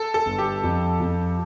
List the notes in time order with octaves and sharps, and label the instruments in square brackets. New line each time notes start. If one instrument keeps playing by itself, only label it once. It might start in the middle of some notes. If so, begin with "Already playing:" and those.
Already playing: [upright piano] A4
A4
[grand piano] G1
[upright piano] G4
[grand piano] F2
F2